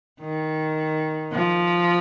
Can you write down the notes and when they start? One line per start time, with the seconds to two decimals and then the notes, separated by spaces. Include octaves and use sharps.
0.21 D#3
1.32 F3